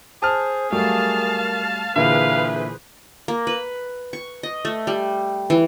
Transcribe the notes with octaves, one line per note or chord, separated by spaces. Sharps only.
G#4 C5 A5 F6
F#3 G3 A3 A#4 F5 A5
A#2 D3 E3 G#4 B4 C5 E5 F5
A#3
B4
C#6
D#5
A3
G3
E3